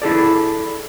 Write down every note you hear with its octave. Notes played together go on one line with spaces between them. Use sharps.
E4 G#4 A4 D5